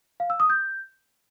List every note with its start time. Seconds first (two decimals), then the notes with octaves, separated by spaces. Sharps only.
0.20 F5
0.30 E6
0.40 D#6
0.50 G6